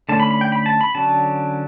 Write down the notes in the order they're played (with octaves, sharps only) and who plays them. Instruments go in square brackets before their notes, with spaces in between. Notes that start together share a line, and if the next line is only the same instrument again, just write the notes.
[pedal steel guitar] D3 A3 C#4 A5
B5
B5
G5
B5
A5
B5
D3 F#3 C#4 A5